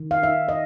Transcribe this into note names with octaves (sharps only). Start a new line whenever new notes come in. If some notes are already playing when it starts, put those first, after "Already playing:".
Already playing: D#3
F5
D#4 E5
D#5